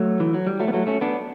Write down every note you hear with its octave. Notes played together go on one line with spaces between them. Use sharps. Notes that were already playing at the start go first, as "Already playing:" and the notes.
Already playing: F#3 A3
E3
F#3
G3
F#3 A3
B3
F#3 A3
A3 C#4
B3 D4